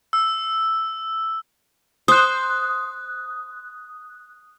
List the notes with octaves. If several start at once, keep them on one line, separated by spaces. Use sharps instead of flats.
E6
C5 D#6 F#6